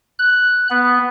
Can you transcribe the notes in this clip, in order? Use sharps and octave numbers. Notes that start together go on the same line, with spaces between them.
F#6
B3